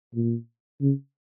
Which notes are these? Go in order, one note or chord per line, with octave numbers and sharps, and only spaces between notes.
A#2
C#3